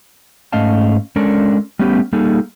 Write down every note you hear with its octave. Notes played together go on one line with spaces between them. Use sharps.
G#2 A3 C#4 D#5 F5 A5
G#3 C#4 D4 A4 A#4 D5
G3 A3 B3 C#4 G4
G3 A#3 D#4 G#4 A4